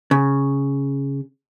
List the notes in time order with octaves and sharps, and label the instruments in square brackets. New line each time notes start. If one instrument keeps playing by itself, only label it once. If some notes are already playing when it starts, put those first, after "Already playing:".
[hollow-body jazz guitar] C#3